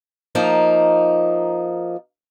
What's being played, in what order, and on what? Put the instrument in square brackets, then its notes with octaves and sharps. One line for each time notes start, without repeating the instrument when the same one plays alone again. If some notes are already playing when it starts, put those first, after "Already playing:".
[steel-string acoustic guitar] F3 A#3 D#4